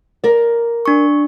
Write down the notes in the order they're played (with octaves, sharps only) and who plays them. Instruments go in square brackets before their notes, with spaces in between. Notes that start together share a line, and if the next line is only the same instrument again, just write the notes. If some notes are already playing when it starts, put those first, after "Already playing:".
[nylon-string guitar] A#4 D5
[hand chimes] D4 C#6